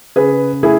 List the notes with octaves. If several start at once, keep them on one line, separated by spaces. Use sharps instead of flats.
C#3 G#4 B4
A3 E4 G#4